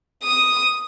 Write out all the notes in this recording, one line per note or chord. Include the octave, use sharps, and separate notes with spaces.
D#6